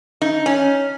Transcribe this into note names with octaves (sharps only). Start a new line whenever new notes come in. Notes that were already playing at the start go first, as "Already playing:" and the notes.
D#4
C#4